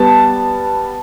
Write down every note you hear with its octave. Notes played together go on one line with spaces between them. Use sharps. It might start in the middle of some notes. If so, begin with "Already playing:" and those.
Already playing: G3 B3 A5